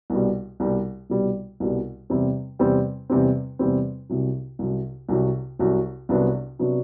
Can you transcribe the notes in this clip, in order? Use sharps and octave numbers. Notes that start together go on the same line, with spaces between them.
C2 B2 G3
C2 B2 G3
C2 B2 G3
C2 B2 G3
E2 C3 G3 C4
E2 C3 G3 C4
E2 C3 G3 C4
E2 C3 G3 C4
C2 C3 F#3
C2 C3 F#3
C2 C3 F#3
C2 C3 F#3
C2 C3 F#3 B3 D4
C3 F#3 B3 D4